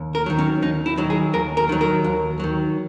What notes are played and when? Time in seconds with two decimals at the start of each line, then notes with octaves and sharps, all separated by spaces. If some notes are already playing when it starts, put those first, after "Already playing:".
Already playing: D#2
0.15 A#4
0.26 D#3 F#3
0.39 C#4
0.62 D#2 D#4
0.86 E4
0.98 D#3 F#3
1.10 G#4
1.33 D#2 A#4
1.57 A#4
1.69 D#3 F#3
1.81 A#4
2.04 D#2
2.40 D#3 F#3